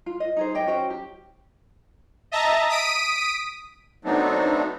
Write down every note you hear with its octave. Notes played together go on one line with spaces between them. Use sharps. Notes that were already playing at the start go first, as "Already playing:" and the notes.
F4
D#5
D#4 G#4 C5
G4 D#5 G5
C#4 F#4 C5 G5
G4
D#5 E5 A5 A#5
D#6 B6 D7 D#7
F#3 A3 B3 C4 D4 D#4